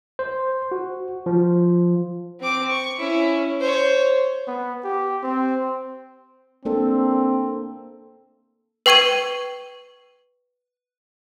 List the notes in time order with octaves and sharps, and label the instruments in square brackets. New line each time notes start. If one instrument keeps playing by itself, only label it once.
[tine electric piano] C5
F#4
F3
[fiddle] C4 D6
C#6
C#4 E4
C5 C#5
[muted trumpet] B3
G4
C4
[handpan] A#3 D4 A4 [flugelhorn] C4
[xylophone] B4 G5 C#6 G#6 D#7